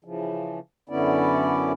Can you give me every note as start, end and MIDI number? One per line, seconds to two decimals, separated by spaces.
0.04 0.59 49
0.04 0.59 52
0.04 0.59 53
0.89 1.72 42
0.89 1.72 50
0.89 1.72 59
0.89 1.72 61
0.89 1.72 64
0.89 1.72 74